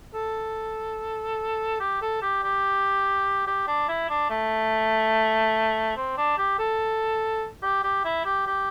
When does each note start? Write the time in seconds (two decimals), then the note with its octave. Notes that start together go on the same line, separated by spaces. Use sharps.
0.14 A4
1.80 G4
2.02 A4
2.22 G4
2.43 G4
3.47 G4
3.67 D4
3.88 E4
4.10 D4
4.30 A3
5.96 C4
6.18 D4
6.38 G4
6.59 A4
7.63 G4
7.83 G4
8.05 E4
8.25 G4
8.47 G4